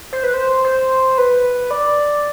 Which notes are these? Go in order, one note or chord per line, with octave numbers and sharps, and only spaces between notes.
C5
B4
C5
C5
B4
D5